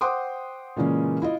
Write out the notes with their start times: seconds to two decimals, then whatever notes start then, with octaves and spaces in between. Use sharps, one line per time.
0.01 C5 F#5 G5 C6 D6 D#6
0.76 A#2 C#3 E3 G#3 A#3 C#4
1.22 E4 F4 D#5